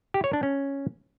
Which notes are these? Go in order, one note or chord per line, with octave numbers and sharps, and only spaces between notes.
G4
C#5
D4
C#4